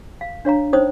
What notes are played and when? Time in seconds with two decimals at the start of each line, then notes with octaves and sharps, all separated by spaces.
0.21 F5
0.45 D4 C#5 F5 A#5
0.73 C#4 D#4 C5 C#5 D#6